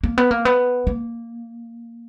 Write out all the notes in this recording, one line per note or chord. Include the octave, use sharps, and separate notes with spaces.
A#3
B3
A#3
B3
A#3